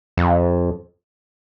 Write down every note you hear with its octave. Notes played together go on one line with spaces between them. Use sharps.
F2